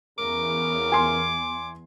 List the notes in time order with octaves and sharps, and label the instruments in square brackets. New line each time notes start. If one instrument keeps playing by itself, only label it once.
[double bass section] E2 [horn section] C#3 A#4 [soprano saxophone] D6
[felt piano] G#5 C6